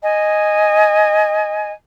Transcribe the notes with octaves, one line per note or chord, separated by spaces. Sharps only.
D#5 G#5